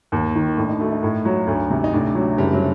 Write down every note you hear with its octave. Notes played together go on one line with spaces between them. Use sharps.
D#2
D#3
A2 D4
D#4
A3 F#4
D#4
A2
F#3
D2
C3
D#4
A2 D4
F#3
F#1 G3
F#3